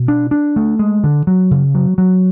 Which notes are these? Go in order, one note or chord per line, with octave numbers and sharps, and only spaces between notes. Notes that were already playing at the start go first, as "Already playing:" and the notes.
Already playing: B2
D4
D4
A3
G#3
D3
F#3
C#3
F#3
F#3